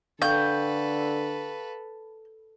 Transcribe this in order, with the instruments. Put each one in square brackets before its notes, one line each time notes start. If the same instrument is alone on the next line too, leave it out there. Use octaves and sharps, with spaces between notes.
[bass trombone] D3 [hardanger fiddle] A4 B4 [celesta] F5 G5 C#6 [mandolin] G6